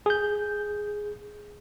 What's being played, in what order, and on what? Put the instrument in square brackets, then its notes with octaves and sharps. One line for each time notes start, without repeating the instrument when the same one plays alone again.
[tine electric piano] G#4 G6